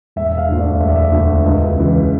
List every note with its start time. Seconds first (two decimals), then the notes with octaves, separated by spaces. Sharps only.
0.16 E1 E5
0.29 E5
0.38 F5
0.49 D2 D3
0.60 D5
0.80 E1 E5
0.88 D5
0.96 E5
1.12 D2 D3
1.44 C#2
1.76 C#3 E3